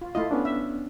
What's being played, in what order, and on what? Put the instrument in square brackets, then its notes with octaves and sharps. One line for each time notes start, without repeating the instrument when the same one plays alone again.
[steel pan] F4
[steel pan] A3 E4 F4 [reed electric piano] D#5
[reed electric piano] B3 C#4 D4
[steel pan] E5